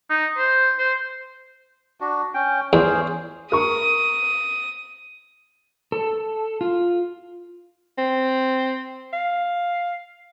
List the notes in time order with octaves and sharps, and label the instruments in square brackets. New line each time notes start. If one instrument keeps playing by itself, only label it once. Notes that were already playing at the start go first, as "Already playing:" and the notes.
[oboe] D#4
C5
C5
[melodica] D4 F#4
C#4 G5
[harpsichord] E2 [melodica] C#4 G#4 C5
[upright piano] A#4 C#6 [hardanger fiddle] D#6
[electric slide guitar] A4
F4
[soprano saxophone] C4
F5